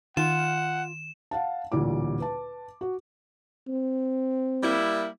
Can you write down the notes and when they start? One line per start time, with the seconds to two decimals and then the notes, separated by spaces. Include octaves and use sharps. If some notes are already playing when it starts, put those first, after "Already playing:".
0.17 D#3 F4 F#5 E7
1.31 F5 F#5 A5
1.72 A1 D2 A#2 G3 D6
2.20 B4 A5
2.81 F#4
3.68 C4
4.63 G3 A#3 E4